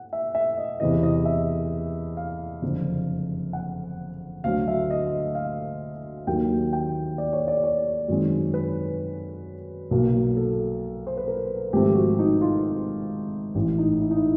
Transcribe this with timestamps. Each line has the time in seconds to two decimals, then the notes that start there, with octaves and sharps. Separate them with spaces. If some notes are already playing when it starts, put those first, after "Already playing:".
Already playing: F#5
0.13 E5
0.35 E5
0.57 D#5
0.80 E2 C3 E3 D#5
1.03 D#5
1.25 E5
2.17 F5
2.62 F#1 F2 D3
3.53 F#5
4.44 D2 D3 F#3 F5
4.68 E5
4.90 D#5
5.35 F5
6.27 D#2 D#3 F#3 A#3 G5
6.73 G5
7.18 D5
7.33 C#5
7.48 D5
7.63 C#5
8.08 F#2 D#3 G#3 C4
8.54 B4
9.91 B1 A#2 F#3 A#3
10.37 A4
11.07 C5
11.17 B4
11.28 A#4
11.73 G#1 G#2 F3 A3 C4 G4
11.95 F#4
12.19 D#4
12.41 F4
13.55 A1 A2 E3
13.78 D#4
14.01 E4
14.11 D#4
14.15 E4